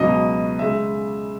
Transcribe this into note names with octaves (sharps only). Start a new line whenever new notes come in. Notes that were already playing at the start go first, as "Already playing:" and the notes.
Already playing: C#2 B2 F#3 D#5
C#3 G#3 E5